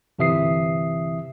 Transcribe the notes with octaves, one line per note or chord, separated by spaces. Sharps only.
G1 C3 E3 E5 D#6 C7